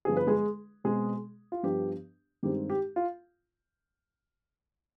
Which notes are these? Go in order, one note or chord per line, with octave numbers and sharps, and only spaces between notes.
G2 D3 F3 B3 D4 G#4
B4
G#3 G#4
B2 G#3 C4 G#4
F4
G2 F3 B3 D4 G4
G2 D#3 G#3 C4 G4
G4
F4